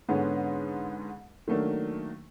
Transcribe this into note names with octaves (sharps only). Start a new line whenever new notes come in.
G#2 D3 B3 C#4
D#3 F#3 A3 A#3 D4